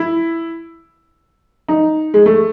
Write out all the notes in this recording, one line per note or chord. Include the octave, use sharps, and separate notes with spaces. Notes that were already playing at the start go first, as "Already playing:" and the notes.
Already playing: E4
D#4
G#3
A3